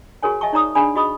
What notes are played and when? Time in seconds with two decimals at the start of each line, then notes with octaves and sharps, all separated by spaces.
0.23 F#4 G#4 A#4 C#5 G#5
0.41 D#5 E5 G#5 A5 C#6
0.53 D#4 C#5 D5 A#5 C#6 D#6
0.75 D4 G#4 D5 G#5 B5
0.95 F#4 G#4 D#5 B5 C#6 D#6